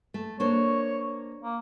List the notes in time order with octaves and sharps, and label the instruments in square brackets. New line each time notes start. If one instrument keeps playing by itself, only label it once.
[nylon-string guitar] A3
[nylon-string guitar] A#3 D4 C5 [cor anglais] C#5
[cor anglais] A#3